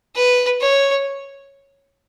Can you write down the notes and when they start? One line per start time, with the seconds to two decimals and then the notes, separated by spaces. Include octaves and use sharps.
0.16 B4
0.61 C#5